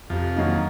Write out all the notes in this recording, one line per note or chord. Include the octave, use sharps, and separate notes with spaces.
F2 C3
D#3 F#3 A#3 D#4